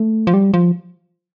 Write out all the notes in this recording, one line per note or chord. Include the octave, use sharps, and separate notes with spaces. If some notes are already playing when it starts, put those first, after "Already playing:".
Already playing: A3
F3
G3
F3